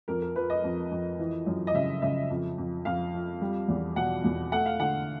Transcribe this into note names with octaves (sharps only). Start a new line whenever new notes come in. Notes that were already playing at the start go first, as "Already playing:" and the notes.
F2 A#4
A#4
F3 B4
D#5
F2
F2
E3
F#2
D#5
C#3 E5
C#3 E5
F2
F2
F2 F5
F3
G3
E2
B2 F#5
E2
A3 F#5
F5
D3 F#5